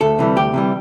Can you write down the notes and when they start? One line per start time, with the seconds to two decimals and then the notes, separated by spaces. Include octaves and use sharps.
0.01 D2 A4
0.19 C3 E3 G3
0.36 D2 G4
0.54 C3 E3 G3